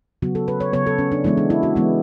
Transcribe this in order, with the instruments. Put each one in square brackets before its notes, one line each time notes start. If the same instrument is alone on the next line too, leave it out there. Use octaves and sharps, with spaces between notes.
[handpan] C#3 F#3 B3 F#4
A4
B4
C#5
C#3 F#3 B3 C#5
A4
C#4
D4
E3 G#3 B3 E4
D4
E4
F#4
E3 G#3 B3